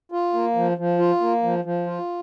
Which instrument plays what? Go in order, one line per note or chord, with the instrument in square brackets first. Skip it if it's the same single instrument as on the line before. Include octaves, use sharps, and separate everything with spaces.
[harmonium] F4
A#3
F3
F3
F4
A#3
F3
F3
F4